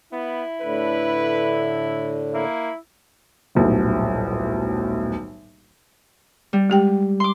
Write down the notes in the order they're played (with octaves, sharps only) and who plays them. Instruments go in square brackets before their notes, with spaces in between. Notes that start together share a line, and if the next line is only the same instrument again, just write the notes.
[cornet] B3 [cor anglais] E4
[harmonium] A2 D3 [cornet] B4
[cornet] A#3 [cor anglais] E4
[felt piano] D#1 B1 A2
[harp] G3
[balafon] G#3 G4 G5
[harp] C6 D6